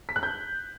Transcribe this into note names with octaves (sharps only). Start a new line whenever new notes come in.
B6
F#6
G6